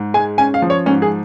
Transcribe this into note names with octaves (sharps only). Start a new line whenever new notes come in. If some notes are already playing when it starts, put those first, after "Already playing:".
Already playing: G#2
G#3 G#5
C#4 G#5
F5
F3
C#5
G#2 C#4
G#4